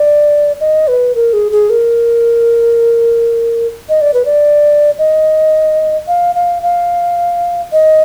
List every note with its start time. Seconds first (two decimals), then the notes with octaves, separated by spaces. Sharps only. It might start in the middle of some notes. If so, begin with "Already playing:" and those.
Already playing: D5
0.60 D#5
0.88 B4
1.15 A#4
1.33 G#4
1.52 G#4
1.70 A#4
3.89 D#5
4.01 D5
4.14 B4
4.25 D5
4.98 D#5
6.08 F5
6.35 F5
6.63 F5
7.72 D#5